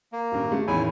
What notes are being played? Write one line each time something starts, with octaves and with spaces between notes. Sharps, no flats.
A#3
D#1 G2
G#3 A3
A1 E2 D#3 E4 G#5